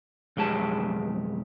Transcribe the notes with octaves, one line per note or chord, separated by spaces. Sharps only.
B1 F2 G#3 G4 A5